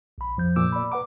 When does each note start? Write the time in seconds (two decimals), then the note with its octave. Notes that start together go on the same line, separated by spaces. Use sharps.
0.18 A#1 B5
0.37 F2 F3 G6
0.56 A#2 D6 E6
0.72 D5 B5
0.92 B4 F#5 A#5 D6